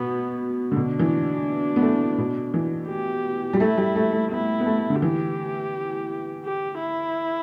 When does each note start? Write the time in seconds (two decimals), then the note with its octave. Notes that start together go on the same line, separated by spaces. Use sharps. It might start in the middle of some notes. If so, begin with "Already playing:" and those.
Already playing: B2 B3
0.72 D3
0.76 B2 D4
0.99 E3
1.76 B3
1.82 A3
2.18 B2
2.54 E3
2.89 G4
3.53 G3
3.60 A3 E4
3.78 G3
3.96 A3
4.13 A3
4.31 B3 E4
4.60 B3
4.66 A3
4.90 D3
5.01 E3 G4
6.44 G4
6.80 E4